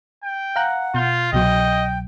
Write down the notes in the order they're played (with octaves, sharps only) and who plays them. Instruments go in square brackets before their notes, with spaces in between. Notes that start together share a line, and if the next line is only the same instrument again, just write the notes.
[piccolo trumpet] G5
[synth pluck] F5 A#5 F#6 [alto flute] F#5
[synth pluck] B2 G6 [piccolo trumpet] F4
[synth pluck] C2 B2 F#3 [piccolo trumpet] D#5 [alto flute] G5